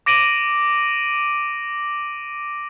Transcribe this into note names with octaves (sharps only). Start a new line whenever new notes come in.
D6 A#6 D7 D#7 F#7